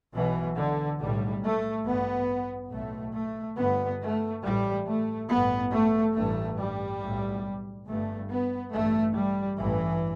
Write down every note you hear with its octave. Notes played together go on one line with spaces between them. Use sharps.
B1 B2 E3
D3
B1 A2 G3
A3
A1 G2 B3
B1 A2 A3
A3
G1 G2 B3
A3
A1 A2 G3
A3
A1 G2 B3
A3
A1 G2 A3
G3
B1 A2
G1 G2 A3
B3
A1 G2 A3
G3
A1 G2 E3